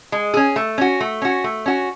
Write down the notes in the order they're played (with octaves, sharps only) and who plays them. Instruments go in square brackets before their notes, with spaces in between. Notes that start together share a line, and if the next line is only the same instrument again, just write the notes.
[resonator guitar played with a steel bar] G#3
C#4 G#4
A3
C#4 F#4
A3
C#4 F#4
A3
C#4 F#4